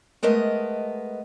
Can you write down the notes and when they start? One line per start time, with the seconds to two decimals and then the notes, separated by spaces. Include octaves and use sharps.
0.23 G#3 A3 B3 A#4 D#5